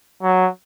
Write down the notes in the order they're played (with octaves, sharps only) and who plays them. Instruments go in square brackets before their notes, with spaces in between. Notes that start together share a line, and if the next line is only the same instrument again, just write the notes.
[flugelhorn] F#3